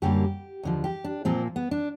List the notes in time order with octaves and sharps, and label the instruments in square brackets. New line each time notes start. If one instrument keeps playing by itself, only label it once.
[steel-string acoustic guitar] F#2 D3 G3 A#3 G4
D#2 D3 F3
G4
D4
A#2 F3 A#3 C4
B3
D4